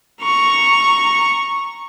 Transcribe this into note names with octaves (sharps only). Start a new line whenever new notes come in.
A#5 C#6